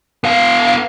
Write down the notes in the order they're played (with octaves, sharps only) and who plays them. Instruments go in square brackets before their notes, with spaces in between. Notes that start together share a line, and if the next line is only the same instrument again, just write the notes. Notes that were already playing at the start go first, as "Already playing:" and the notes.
[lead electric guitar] B3 F5